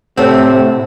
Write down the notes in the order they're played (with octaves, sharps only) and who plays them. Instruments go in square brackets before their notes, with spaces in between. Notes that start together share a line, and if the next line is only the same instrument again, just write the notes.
[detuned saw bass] A2 [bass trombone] C3 [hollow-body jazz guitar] A3 C4 [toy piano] C5 C#5 F#5